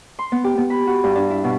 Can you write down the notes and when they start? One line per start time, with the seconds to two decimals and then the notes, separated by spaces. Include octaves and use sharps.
0.19 C6
0.32 B3
0.44 G4
0.58 B3
0.70 B5
0.87 F#4
1.04 G2
1.15 D4
1.30 E4
1.44 B2